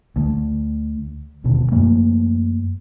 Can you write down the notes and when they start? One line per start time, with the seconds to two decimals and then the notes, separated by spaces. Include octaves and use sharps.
0.16 D2 A3
1.44 E1 D#2 B2 D3
1.72 F#2 F3 A3 A#3